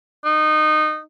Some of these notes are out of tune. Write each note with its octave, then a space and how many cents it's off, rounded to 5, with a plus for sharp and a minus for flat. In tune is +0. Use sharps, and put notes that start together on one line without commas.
D#4 -20